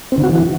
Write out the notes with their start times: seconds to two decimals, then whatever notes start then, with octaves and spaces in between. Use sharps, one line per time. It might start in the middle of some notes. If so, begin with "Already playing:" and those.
0.12 C4
0.18 D3
0.23 F#4
0.29 E3